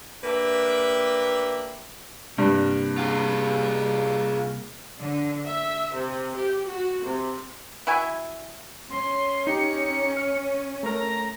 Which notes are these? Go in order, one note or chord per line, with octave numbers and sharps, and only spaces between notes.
A#3 D4 G4 B4 E5
G2 C3 G3 A#3
F4 G#4
D3
E5
C3
G4
F#4
C3
E4 F#4 E5 G#5
C#4 C6
D#4 G4 C#7
F6
A3 A#4 A#5